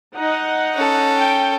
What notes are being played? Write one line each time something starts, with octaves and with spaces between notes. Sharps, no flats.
D#4 F#5
C#4 A4
G5